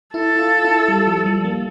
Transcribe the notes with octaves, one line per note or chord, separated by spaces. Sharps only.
E4 A4
F4
E4
G3
F3
G3
A#3